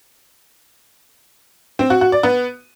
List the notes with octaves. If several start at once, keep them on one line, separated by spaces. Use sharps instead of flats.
C4
F#4
F#4
D5
B3